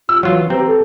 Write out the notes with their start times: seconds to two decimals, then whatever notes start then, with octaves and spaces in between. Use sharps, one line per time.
0.09 F4 E6
0.23 E3 F#3 F4
0.50 C4 G4 B4 A#5
0.66 A4